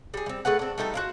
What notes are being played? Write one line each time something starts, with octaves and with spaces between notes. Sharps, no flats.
G3 G#4
G3 C4
A3 G#4 B4 F#5
C4 D4
G3 A3 D#4 A4
F#4 C5 F5